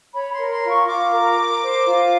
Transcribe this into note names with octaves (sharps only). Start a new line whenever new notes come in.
C#5 B5
C6
A#4
C6
F4
C#6
F4 D6
A#4
A#4
C5
F4